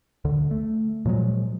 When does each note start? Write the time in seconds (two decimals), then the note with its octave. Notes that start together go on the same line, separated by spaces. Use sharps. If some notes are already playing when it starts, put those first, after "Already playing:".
0.25 D2 D3
0.51 A3
1.05 A#2 F3 F#3 G#3